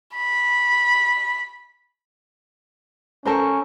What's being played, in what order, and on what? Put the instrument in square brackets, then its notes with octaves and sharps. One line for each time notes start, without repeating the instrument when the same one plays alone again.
[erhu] B5
[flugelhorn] C#4 [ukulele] A4 A#4 C5